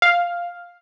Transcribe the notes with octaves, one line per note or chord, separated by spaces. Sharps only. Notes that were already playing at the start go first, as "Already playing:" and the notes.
F5